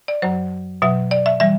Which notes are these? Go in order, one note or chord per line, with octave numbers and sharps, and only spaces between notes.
D5
F#2 F#3 C5
B2 F#3 E5
D5
E5
E3 G3 E5